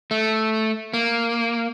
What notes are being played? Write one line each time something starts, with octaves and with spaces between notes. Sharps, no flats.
A3
A#3